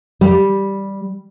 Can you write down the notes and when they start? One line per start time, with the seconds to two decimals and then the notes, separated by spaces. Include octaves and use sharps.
0.21 G3